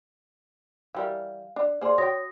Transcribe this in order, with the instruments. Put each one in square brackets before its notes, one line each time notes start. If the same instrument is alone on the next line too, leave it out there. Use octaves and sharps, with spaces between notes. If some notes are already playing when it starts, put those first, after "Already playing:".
[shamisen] E3 G3 A#4 [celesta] F5
[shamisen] D4
[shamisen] A#3 G#4 [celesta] C5 D5 C6
[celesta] F#4 D#6 A#6 [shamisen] C#5 G5